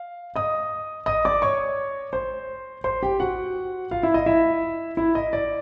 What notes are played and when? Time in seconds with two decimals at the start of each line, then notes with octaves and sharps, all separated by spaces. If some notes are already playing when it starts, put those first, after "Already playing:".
Already playing: F5
0.36 D#5 D#6
1.06 D#5 D#6
1.25 D5 D6
1.42 C#5 C#6
2.13 C5 C6
2.84 C5 C6
3.03 G4 G5
3.20 F#4 F#5
3.91 F4 F5
4.03 E4 E5
4.14 D#5
4.26 E4 E5
4.97 E4 E5
5.15 D#5
5.33 D5